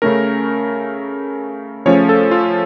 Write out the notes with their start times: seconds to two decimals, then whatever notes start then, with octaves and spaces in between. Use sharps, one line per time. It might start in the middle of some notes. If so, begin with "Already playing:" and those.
0.02 C#3 A3 C#4 A#4
1.85 C#3 F3 A3 C#4 C#5
2.09 A4
2.31 F4